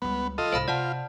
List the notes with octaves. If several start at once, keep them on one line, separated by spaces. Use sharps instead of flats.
C#2 G3 B3
D#3 F4 A4 D#5
C2 G#2 C5 F5 B5
C3 F4 D5 F#5 A5